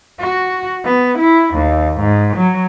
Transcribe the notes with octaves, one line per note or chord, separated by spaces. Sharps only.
F#4
B3
E4
D#2
G#2
F#3